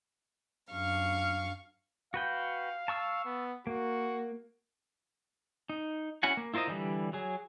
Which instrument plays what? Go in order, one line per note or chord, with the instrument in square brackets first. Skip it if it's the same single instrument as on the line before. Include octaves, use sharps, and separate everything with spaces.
[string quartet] F#2 D4 F5 C#6 F6
[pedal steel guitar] F#4 B4 G5 [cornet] F5
[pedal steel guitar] A5 C#6 E6
[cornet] B3
[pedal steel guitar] A#3 [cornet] F#4
[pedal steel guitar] D#4
C#4 E4 F#4 F#5 G#5
A#3
E4 F4 A#4 C5 D#5
D3 E3 G3
F#3 G#4